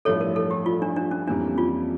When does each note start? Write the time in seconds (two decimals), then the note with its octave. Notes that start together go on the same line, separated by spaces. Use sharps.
0.05 A1 G2 F3 A3 E4 A4 C#5
0.21 A#4
0.36 A4
0.51 G4
0.66 F4
0.82 D4
0.96 D4
1.11 C#4
1.27 F2 E3 G3 A#3 C#4 D4
1.58 F4